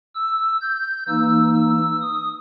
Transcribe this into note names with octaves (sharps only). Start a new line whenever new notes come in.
E6
G6
E3 A#3 D#4 E6
E6
D#6